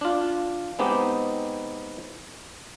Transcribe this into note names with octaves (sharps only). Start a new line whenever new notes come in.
D4 F4
G#3 B3 C4 D#4 G4